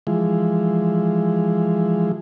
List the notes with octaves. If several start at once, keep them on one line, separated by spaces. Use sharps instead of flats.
E3 F3 G#3